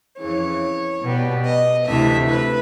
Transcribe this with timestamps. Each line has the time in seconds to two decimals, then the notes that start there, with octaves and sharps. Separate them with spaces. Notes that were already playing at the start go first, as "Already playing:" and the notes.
0.19 F2 C#3 E3 C#5
1.03 B2 G3 B3
1.45 D#5
1.86 D2 C3 E3 A3 E5
2.28 B4